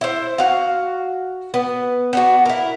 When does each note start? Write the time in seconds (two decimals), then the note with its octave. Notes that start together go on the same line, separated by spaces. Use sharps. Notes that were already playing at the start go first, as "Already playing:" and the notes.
0.01 E4 C5
0.38 F#4 F5
1.54 B3
2.13 B3 D4 F#4
2.46 E4 A#4